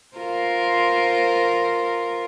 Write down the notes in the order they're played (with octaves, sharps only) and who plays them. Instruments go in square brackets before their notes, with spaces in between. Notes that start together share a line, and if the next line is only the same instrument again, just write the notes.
[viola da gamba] F4 A#4 C5